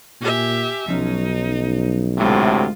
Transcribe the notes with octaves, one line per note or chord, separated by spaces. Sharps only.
A#2 G4 E5 G#5
B1 F3 F#3 C#4 D#4
D2 A2 C3 G#3 A3 F4